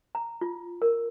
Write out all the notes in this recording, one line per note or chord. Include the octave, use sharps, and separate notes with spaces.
A#5
F4
A#4